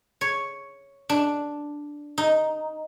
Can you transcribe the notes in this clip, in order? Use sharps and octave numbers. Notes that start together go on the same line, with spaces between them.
C#5
D4
D#4